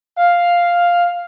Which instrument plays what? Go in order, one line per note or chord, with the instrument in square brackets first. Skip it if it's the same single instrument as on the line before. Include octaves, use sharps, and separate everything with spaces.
[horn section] F5